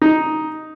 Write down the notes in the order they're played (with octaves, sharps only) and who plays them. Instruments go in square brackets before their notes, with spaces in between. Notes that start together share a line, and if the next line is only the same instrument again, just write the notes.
[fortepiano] D#4